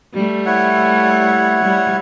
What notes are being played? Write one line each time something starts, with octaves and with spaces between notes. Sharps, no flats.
G3 A3
E4 C#5 F#5
G3